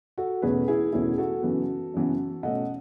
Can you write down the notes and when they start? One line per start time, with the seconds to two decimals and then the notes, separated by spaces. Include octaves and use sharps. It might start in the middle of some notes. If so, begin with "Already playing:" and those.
0.18 F#4 A4
0.42 E2 B2 A3 C#4 G#4 B4
0.68 E4 G#4
0.93 E2 B2 A3 C#4 E4 G#4
1.18 F#4 A4
1.43 F#2 C#3 E3 B3
1.94 F#2 C#3 E3 B3
2.43 B2 A3 C#4 D#5 F#5